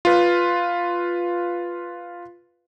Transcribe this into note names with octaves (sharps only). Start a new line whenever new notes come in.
F4 B4